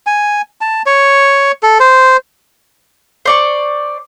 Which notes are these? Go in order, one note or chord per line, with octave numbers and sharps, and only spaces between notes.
G#5
A5
C#5
A4
C5
C5 D5 C#6